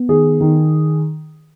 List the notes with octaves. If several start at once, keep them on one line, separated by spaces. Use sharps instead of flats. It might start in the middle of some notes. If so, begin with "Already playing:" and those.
Already playing: B3
D#3 G#4
D#3